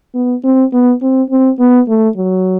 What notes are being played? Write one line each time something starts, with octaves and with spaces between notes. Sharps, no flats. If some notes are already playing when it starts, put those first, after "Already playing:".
B3
C4
B3
C4
C4
B3
A3
F#3